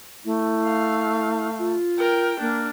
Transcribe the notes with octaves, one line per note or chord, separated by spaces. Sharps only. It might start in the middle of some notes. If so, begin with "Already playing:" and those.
A3 E4
F5
F4
A#4 G5
A#3 D4